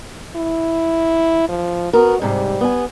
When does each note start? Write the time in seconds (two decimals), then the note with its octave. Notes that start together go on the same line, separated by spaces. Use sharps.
0.36 E4
1.49 F3
1.93 B3 F#4 A#4
2.22 G#2 C3 G3
2.61 B3 G#5